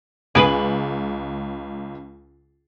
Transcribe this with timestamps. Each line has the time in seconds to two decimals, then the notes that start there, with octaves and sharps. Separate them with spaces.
0.35 C#2 G#4 B4 F#7